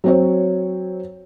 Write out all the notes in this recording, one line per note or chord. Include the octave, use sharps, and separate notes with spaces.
F#3 C4 C#5